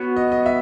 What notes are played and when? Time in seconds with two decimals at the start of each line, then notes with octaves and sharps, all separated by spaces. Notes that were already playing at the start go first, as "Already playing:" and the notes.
Already playing: B3 F#4 C#5
0.17 D#5
0.32 D#5
0.46 E5